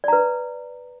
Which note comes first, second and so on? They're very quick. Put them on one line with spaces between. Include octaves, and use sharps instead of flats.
D5 A#5 B4